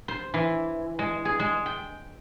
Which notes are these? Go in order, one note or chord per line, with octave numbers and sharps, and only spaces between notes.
C5
E3
G#3
G#4
G#3
G5